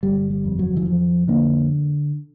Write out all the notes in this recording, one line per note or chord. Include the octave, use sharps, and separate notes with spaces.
G1 G3
G3
F2
F#3
E3
F2 F3
D3 A#3